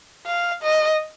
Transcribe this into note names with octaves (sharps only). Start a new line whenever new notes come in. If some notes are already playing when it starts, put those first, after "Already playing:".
F5
D#5